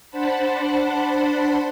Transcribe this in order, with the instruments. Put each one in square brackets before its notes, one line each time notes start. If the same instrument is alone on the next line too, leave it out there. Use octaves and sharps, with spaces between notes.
[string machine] D4 C5 F#5 A5 B5